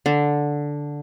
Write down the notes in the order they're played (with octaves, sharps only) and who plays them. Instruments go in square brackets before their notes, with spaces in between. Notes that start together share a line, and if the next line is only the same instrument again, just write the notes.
[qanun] D3